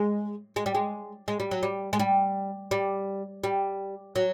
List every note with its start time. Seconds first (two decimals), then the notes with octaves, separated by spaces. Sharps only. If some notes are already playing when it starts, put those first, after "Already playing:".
Already playing: G#3
0.56 G#3
0.66 G3
0.75 G#3
1.28 G#3
1.40 G3
1.51 F#3
1.63 G3
1.93 G#3
1.99 G3
2.71 G3
3.44 G3
4.15 F#3